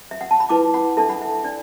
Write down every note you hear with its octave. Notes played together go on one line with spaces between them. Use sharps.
E5
F#5
A5
B5
E4 B4 A5 D6
F#5 B5
D4 A4 E5 A5
F#5 B5
E5
E5
D4 D5